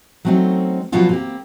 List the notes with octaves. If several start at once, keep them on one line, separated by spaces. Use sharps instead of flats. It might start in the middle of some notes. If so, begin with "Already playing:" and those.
F#3 A3 C4 C#4 D#4
B2 F3 F#3 B3 F4 F#4
A#3 C4 G4